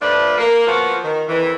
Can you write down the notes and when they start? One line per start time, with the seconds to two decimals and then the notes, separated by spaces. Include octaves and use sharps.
0.01 F3 A3 D4 F4 B4
0.38 A#3
0.67 F3 A#3 B3 F4 F#4
1.04 D#3
1.28 F2 D#3 E3